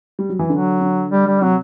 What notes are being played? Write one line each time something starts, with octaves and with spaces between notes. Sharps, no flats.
G3
F#3
E3
D3 F#3
D3
G3
G3
C3 F#3